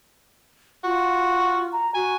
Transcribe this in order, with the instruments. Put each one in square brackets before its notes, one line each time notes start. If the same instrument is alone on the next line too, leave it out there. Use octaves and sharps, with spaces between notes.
[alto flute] F4 [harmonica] F#4
[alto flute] A#5
[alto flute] F#4 [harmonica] G#5